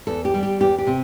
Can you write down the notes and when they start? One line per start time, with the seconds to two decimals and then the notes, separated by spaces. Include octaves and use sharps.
0.07 E2 A4
0.25 G4
0.34 G3
0.43 G4
0.60 E2 G4
0.78 G4
0.87 C3